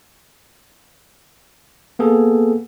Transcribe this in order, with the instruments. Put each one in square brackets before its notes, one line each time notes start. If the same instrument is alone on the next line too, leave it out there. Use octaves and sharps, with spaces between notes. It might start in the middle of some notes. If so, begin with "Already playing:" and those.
[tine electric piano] A#3 B3 G#4 A4